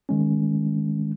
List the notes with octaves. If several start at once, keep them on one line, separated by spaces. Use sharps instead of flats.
D#3 G#3 C#4